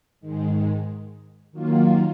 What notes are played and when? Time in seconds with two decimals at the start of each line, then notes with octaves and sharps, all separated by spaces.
0.20 G#2 D#3 G#3
1.52 D#3 F#3 A#3 F4